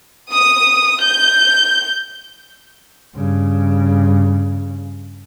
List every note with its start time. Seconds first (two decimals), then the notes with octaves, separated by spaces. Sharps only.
0.32 D#6
1.02 G6
3.15 G2 C#3